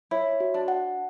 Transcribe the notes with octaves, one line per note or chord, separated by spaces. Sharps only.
E4 C#5
F#4
D4
F#5